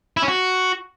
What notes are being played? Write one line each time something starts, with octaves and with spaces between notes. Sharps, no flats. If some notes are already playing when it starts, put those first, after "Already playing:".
E4
C#4
F#4